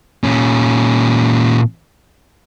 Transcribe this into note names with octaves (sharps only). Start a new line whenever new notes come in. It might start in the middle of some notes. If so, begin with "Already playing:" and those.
A#2 C#4